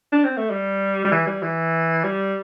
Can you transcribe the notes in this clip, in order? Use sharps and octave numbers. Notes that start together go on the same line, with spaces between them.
D4
C4
A3
G3
G3
E3
G3
E3
G3